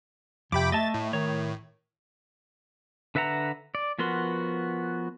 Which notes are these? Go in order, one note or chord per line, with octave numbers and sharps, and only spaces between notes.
F2 C3 G5 B5 D6
A3 D#5 E5 A5 A6
A2
D#3 C#5
D3 B4 E5 F#5 A#5
D5
F3 B3 F#4 A#4 C6